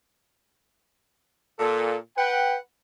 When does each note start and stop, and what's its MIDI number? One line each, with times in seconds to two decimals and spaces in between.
1.59 1.96 46
1.59 1.96 69
2.17 2.58 71
2.17 2.58 78
2.17 2.58 79